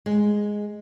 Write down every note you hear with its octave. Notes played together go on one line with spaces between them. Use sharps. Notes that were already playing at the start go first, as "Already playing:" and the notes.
G#3